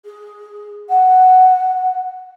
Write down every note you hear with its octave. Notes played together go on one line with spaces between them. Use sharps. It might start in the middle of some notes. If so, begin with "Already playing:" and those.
G#4
F#5